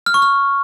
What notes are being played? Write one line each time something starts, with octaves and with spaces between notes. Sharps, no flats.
F6
C#6
F6